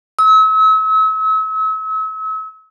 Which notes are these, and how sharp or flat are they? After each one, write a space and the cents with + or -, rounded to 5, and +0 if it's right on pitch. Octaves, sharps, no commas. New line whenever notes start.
E6 -40